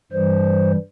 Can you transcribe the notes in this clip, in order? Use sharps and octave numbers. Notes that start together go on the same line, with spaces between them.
G2 E3 G3 C5